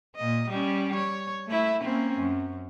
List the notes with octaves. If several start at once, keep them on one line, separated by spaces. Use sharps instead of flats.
A#2 D#5
G3 C#4
C#5
A3 E4
A#3 C4 C#4
F#2